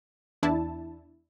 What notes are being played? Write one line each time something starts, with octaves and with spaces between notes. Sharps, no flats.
E2 D4 E4 A5